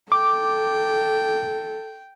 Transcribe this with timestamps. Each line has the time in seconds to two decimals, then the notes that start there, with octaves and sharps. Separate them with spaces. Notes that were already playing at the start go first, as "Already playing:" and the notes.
0.12 A4 G5 D6